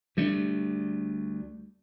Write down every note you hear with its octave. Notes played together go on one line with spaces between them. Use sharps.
D2 G3 A3 D4